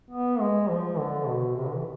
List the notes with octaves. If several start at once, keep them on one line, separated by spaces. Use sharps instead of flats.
B3
G#3
F3
D3
B2
C3
D3
E3